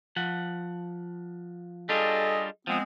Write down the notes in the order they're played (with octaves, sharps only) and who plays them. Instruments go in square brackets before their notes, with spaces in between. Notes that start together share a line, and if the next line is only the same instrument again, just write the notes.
[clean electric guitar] F3 F#5
[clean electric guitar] G3 D4 F4 [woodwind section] G#4 A4 D#5
[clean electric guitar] F3 [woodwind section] G#3 B3 C4